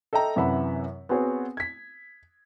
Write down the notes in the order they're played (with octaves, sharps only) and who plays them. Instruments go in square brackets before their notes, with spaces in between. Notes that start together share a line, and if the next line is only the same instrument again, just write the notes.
[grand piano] A4 D#5 E5 G5 A#5
F#2 C3 E3 E5 F#5 B5
B3 C4 F#4 G#4 B4 C#5
G#6 B6